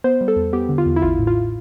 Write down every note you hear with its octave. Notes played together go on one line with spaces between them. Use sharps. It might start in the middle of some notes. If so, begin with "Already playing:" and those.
B3 C5
G3
A4
E2
B3 G4
D3
F4
E2
E4
A1 F4
A2
F4